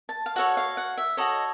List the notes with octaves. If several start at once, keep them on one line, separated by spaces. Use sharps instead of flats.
A5
F5
F#4 A4 C#5 F#5
F5
F#5
E5
F#4 A4 C#5 D#5